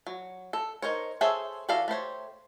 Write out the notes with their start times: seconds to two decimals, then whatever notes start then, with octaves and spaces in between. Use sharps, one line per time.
0.07 F#3
0.53 A4
0.82 D#4 A#4 C5 C#5
1.21 G#4 A4 C5 C#5 E5
1.69 E3 F#4 A4 D5 F5
1.88 A3 G4 C5 C#5